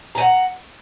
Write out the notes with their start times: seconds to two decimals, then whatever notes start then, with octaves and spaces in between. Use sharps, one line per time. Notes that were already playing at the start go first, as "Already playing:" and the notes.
0.15 A#5
0.18 G#5
0.20 F#5